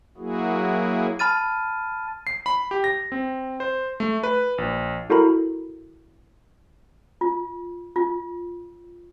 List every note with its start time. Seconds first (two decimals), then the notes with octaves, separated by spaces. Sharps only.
0.18 F#3 A#3 E4 F#4 G#4
1.19 A5 B5 F6 A6 D#7
2.27 C7
2.46 B5
2.71 G4
2.84 A#6
3.12 C4
3.60 C5
4.00 A3
4.23 B4
4.58 A#1
5.10 E4 F#4 A4 A#4 A#5 B5
7.21 F4
7.96 F4